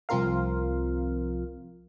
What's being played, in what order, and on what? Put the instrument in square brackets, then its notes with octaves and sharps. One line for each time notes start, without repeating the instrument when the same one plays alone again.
[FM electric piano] C2 F3 C4 F4 A#4 F5